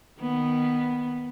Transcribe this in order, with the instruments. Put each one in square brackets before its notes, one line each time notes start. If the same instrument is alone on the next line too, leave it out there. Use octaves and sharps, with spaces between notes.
[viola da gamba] D#3 B3